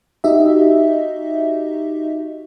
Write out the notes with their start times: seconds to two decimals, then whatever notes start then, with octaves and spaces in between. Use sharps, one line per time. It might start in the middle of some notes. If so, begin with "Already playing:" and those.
0.24 D#4 F#4 G4 D#5 E5